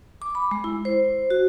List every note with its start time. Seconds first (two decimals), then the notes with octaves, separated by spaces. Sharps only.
0.22 D6
0.35 B5
0.51 G#3
0.64 E4
0.85 C5
1.30 F#4